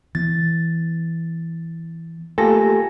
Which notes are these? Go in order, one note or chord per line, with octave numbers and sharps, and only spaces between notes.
E3 B3 A6
A3 A#3 F4 G4 A4 G#5 A#6